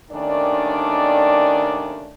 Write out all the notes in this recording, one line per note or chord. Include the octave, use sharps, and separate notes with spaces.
D#2 D#3 A3 C#4 D4 D5